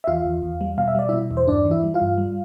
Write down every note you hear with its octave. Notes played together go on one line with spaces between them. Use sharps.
E5
E2 F4 F5
E2
E2
G3
B2 F5
E5
G3 D5
B2 E4 E5
E2
C5
G2 D4 D5
E3
E4 E5
G3
F4 F5
G2
G3